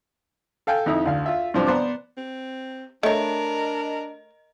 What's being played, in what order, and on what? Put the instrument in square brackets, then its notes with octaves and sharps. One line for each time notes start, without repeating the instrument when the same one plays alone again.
[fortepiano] A4 F5 G5 G#5
F2 D#4 E4 E5
D2 F5
F4 E5
G2 C3 F3 D4 C5 D5
B3 C5 D5 A#5 D6
[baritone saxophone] C4
[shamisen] A3 C#5 [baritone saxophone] D4 [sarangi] A#4 [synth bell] D#5